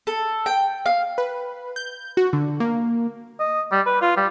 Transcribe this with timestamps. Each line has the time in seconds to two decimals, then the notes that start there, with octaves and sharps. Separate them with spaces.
0.07 A4
0.46 G5
0.86 F5
1.18 B4
1.76 G6
2.17 F#4
2.33 D3
2.60 A#3
3.40 D#5
3.72 G3
3.86 B4
4.02 F4
4.16 G3